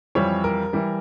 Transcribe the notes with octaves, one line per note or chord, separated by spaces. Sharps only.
F2 E3 G3 C#5
A#4
E3 G3